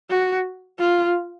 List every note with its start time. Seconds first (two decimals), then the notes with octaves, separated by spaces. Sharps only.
0.10 F#4
0.79 F4